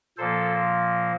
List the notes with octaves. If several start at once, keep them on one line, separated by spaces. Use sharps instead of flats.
A#2 F3 A#3 A4 C5